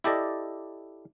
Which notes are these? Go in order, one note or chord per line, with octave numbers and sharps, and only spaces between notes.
E4 G4 A4 D5 D#5